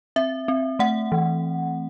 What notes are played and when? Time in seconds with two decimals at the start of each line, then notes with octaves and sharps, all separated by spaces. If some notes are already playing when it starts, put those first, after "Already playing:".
0.16 C4 E5
0.48 C4
0.79 A3 F#5
1.12 E3